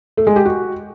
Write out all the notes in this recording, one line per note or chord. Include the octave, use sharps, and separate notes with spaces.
A3
G#3
G4
F#4